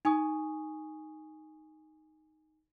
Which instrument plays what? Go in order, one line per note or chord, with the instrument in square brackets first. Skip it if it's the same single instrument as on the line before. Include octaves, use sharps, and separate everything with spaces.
[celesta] D#4 G#5 C#6 D#6